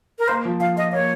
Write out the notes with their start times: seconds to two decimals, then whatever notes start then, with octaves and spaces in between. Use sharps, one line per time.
0.19 A#4
0.28 A#3 C5
0.45 F3
0.60 F3 F5
0.76 F4 D#5
0.93 A#3 C#5